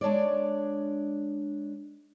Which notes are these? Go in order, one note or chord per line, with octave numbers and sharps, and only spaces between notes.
G#3 D4 C#5 D5